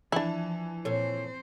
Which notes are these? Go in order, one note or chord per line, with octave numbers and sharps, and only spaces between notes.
E3 F3 D4 E4 A5
A#2 C4 A4 C5 C#5